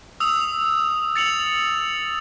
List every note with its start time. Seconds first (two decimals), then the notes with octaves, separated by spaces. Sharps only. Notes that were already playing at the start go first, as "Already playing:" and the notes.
0.20 D#6 E6 F7
1.16 A6 C#7 F7 F#7